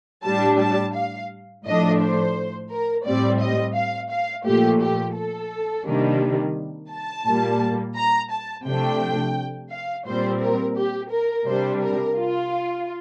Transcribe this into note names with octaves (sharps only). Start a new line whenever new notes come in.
A2 G3 D4 A5
A5
F5
A2 F3 A3 D4 D#5
C5
A#4
A2 G3 C4 D5
D#5
F5
F5
A#2 F3 A3 G4
G4
A4
C3 D#3 G3 A#3 D4
A5
A#2 G3 A#3
A#5
A5
C3 F3 A3 D4 G5
F5
A#2 G3 C4 C5
A#4
G4
A#4
C3 G3 D4 C5
A#4
F4